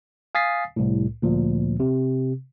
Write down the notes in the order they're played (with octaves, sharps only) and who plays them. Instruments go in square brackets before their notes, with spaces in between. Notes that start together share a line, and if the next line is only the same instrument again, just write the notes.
[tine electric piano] F5 G#5 D#6 A6 B6 C7
C2 A2
D2 A#2 F3
C3